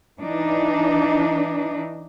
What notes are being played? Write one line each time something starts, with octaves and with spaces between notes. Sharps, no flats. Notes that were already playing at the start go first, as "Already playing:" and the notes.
E3 D4 D#4